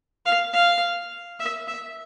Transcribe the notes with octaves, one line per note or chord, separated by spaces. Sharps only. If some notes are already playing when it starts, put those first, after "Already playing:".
F5
F5
E5
E5